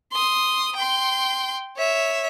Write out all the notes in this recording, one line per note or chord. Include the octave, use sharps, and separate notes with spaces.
C6 D#6
G5 C6
C#5 E5